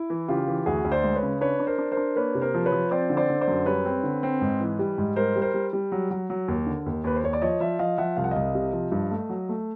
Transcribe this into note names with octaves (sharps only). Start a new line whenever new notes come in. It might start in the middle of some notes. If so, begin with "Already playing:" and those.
Already playing: E4
E3
C#3 F4 G4
E3
D2 F#4 G#4
D2
C5 D5
G#3
B4 C#5
C#3
D4 B4 C#5
D4
A#4 C5
D4
A#4 C5
D4
A#3 B4 C#5
C3
A#4 C5
F3
B4 C#5
F3
C4 C5 D5
D3
C5 D5
D3
C5 D5
F#2
G3 B4 C#5
C4
D3
C4
G#2
E3
G3
G#2
G3 A#4 C5
G3
A#4 C5
G3
G3
F#3
F#3
F#3
D#2
D3
D#2
D#2 B4
C5
D#2 C#5
D5
F3 C#5 D#5
F3 D5 E5
F3 D#5 F5
F3 E5 F#5
C2 F5
F#5
C2 D#5 F5
C3
F3
G2
A3
F#3
A3